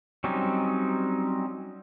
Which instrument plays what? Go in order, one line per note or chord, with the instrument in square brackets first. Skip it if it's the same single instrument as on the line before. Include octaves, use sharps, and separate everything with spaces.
[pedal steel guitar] F#3 G3 C4 C#4 D#4